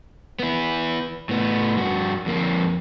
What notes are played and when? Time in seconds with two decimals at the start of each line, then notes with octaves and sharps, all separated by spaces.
0.39 B3 E4
1.29 A2 B3
1.77 G2 F#4
2.26 F2 A#3